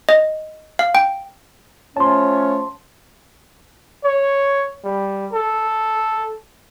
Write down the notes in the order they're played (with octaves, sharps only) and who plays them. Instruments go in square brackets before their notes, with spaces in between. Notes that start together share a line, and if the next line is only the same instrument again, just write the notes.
[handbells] D#5
F5
G5
[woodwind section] F3 A3 C#4 [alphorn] C#5 [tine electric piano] A5 C6
[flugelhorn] C#5
G3
A4